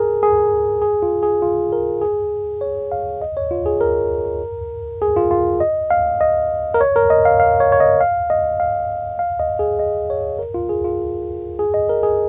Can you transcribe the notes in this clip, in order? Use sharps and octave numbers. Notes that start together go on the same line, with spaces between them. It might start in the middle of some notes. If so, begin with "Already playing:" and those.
Already playing: G#4 A#4
G#4
G#4
F4
G#4
F4
A#4
G#4
C#5
F5
D#5
C#5
F4
G#4
A#4
G#4
F4
F4
D#5
F5
D#5
A#4
C#5
A#4
D#5
F5
F5
C#5
C#5
D#5
F5
D#5
F5
F5
D#5
G#4
D#5
C#5
A#4
F4
G#4
F4
G#4
D#5
A#4
G#4